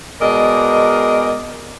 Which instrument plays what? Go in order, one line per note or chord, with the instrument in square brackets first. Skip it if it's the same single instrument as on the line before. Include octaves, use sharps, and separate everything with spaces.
[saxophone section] B2 G#3 A#4 D5 D#5